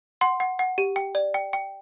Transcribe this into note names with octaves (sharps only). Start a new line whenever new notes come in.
F#5 C6
F#5
F#5
G4
G5
D5
G5
G5